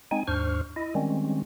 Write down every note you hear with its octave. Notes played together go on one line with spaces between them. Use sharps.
G#3 C4 D#4 G#5
D#2 G#2 D4 C5 C#6 F6
E4 D#5
D#3 G3 G#3 C4 C#4